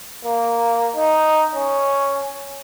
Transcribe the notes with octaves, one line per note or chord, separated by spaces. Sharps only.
A#3
D#4
C#4